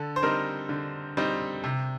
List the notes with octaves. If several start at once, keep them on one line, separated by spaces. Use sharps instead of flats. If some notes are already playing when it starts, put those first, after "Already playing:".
Already playing: D3 A4
C5
G3 C4 D#4 A#4
D3
G3 C4 D#4
C3